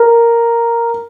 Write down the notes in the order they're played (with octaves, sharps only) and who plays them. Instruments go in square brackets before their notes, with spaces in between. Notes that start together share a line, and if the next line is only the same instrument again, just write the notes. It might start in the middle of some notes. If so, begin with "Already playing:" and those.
Already playing: [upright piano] A#4